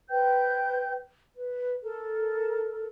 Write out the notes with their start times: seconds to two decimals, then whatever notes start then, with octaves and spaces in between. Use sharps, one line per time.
0.10 B4 C5 G5 G6
1.36 B4
1.83 A4 A#4